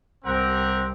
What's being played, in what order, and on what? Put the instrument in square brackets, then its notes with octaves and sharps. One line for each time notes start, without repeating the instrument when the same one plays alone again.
[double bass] C2 [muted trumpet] C4 [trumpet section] G4 A#4 F#5